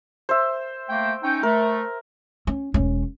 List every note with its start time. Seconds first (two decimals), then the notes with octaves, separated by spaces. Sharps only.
0.29 C5 E5
0.89 A3 A#3 G5
1.23 C#4 D#4 G5
1.43 A3 A#4
2.47 C#4
2.74 E1 C#4